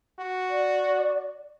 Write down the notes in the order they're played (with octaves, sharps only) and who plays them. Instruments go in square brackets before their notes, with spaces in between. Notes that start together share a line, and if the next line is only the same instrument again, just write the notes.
[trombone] F#4
[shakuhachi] D5